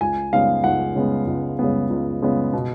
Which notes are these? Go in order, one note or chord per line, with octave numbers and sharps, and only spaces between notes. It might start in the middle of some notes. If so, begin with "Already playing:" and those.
C#2 G#5
C#3 G#3 B3 F5
C#2 F#5
C#3 G#3 B3
C#2
C#3 G#3 B3
C#2
C#3 G#3 B3
B2